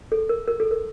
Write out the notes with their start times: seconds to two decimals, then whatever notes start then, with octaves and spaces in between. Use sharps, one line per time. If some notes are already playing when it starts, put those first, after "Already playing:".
0.12 A4
0.29 A#4
0.48 A#4
0.60 A4
0.71 A#4